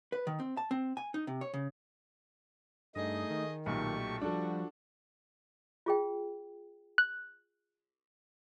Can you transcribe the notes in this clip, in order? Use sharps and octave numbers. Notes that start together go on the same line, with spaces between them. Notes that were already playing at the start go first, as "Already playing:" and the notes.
B4
D#3
C4
A5
C4
G#5
D#4
C3
C#5
C#3
G2 A3 D#4 G#4 D#5
D#3
B1 A#2 A3 G4 C#6
F3 G3 D4 F#4 A4
F4 G#4 G5
F#6